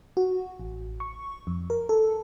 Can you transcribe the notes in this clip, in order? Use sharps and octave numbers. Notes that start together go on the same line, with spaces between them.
F#4
A1
C#6
F2
A#4
A4